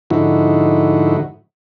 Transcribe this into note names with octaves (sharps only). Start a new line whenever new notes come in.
G#2 D3 F3 D#4 E4 F#4